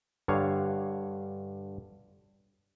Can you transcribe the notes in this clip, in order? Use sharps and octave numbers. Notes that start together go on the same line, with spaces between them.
G2 D3 C#5 F5